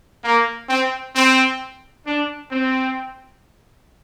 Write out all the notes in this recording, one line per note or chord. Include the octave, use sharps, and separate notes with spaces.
A#3
C4
C4
D4
C4